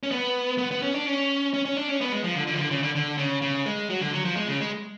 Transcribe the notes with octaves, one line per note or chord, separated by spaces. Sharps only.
C#4
B3
B3
B3
C#4
D4
C#4
C#4
C#4
D4
C#4
B3
G#3
F3
D3
D3
F3
D3
C#3
D3
D3
C#3
C#3
G#3
F#3
D3
F#3
F3
G#3
C#3
G#3